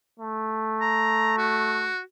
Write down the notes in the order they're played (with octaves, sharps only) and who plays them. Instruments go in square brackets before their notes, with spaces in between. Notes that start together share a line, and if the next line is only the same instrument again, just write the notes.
[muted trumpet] A3
[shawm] A#5
F#4